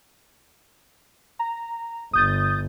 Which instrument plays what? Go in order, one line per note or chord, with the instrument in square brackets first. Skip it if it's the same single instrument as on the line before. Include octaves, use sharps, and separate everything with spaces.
[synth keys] A#5
[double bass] G1 [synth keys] D#6 G6 A6